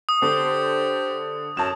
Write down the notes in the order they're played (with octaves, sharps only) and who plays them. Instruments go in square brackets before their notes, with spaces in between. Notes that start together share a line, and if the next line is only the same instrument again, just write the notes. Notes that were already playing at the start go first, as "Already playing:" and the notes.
[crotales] D#6
[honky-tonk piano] D3 [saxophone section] G4 C5
[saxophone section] F#2 F#3 [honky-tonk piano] A5 E7